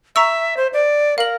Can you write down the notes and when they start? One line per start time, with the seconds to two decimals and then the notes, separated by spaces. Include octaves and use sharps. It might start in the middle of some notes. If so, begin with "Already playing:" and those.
0.16 E5 A#5 C#6 E6
0.57 C5
0.73 D5
1.18 A#4 F5 F#7